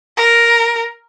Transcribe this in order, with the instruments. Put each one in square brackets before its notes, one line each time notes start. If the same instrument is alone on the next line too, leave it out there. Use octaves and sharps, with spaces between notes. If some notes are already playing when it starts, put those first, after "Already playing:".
[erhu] A#4